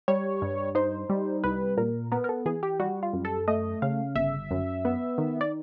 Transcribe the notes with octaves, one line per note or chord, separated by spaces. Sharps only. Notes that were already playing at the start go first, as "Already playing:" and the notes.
G3 C#5
G2
D#4 C5
G3
C2 B4
A#2 A#4
B3 A#4
A#4
A4
E3 G#4
G4
G3 F#4
F4
F#2
A4
A3 D#5
C#3 F5
G1 E5
F#2
B3
D#3
D5